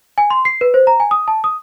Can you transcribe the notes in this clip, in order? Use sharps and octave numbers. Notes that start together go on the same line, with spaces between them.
G#5
C6
C7
B4
C5
A#5
G#5
D#6
A5
D#6